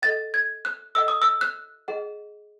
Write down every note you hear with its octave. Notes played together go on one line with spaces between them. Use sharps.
A4 D#5 F#5 A6
G#6
F#6
A4 D#5 F#5 E6
D#6
E6
F#6
G#4 D#5 F#5